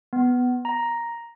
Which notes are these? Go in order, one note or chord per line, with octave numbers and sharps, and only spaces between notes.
B3
A#5